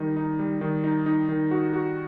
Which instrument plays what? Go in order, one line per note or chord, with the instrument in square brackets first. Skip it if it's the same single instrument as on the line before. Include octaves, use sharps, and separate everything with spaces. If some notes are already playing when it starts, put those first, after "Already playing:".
Already playing: [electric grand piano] D#3 G3 D#4
D#4
G3
D#3
D#4
D#4
D#3
F#4
F#4